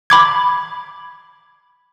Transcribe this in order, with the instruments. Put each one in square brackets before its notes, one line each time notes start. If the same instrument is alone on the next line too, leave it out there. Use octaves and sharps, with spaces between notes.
[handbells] B5 D6 G#6